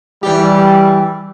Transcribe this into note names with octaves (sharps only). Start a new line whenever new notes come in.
E3 G3 G4